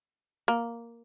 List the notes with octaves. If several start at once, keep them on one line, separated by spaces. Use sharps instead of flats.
A#3